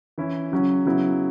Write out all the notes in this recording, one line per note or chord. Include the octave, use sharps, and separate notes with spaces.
E3 C#4 E4
C#3 F#3 C#4
C#3 F#3 B3 E4